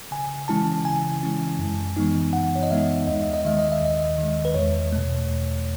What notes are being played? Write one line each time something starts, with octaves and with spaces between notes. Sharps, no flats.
C#3 G#5
E3 G#3 C#4 E4 A5
C#3 G#5
E3 G#3 C#4 E4
F#2
E3 G#3 B3 D#4
F#2 F#5
C#5
D#5
E3 G#3 B3 D#4 E5
D#2 D#5
E5
D#5
D#3 G#3 E5
D#5
E5
D#2 D#5
D#3 G#3
B4
E2 C#5
B2 A3
E2